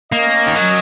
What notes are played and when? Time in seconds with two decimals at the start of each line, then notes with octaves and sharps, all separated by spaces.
0.12 A#3 C#4 A#4 D#5
0.47 D#3
0.55 F#3